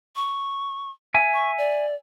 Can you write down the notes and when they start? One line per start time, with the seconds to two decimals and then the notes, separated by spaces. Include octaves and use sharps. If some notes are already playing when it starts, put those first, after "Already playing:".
0.16 C#6
1.14 E5 G#5
1.34 C#6
1.58 D5